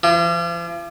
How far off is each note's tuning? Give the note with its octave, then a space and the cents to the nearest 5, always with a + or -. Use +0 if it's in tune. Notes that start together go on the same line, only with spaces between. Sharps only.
F3 -45